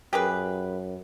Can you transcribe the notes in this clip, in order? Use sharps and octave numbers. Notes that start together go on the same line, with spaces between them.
F#2 G4 G#4 B4